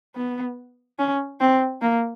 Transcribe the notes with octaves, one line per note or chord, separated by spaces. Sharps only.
B3
C#4
C4
A#3